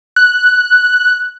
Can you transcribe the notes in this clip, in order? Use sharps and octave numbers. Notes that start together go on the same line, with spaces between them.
F#6